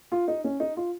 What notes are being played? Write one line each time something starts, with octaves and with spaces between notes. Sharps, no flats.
F4
D#4
C#4
D#4
F4